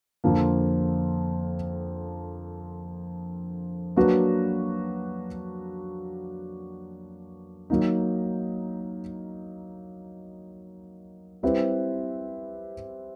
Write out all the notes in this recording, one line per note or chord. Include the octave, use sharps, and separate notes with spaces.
F2 D3 F3 A#3
F#3 A#3 D4 F#4 B4
F#3 A#3 D#4
G3 C4 E4 G4 B4